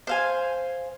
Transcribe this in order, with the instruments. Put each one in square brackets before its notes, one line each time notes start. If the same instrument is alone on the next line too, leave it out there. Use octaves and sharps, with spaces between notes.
[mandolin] C5 F5 G#5